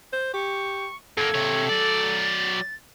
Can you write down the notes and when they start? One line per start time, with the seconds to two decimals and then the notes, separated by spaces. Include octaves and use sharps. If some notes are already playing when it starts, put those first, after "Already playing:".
0.13 C5
0.33 G4 C#6
1.17 F#2 A#3 A4 G#6
1.35 C3 C#5
1.69 F#3 D5 A6